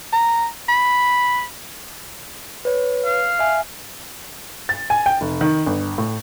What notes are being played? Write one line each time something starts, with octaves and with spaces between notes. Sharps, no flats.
A#5
B5
B4 C#5
F5
E5 G#5
A6
G#5
G5
F1
D#3
G1
A2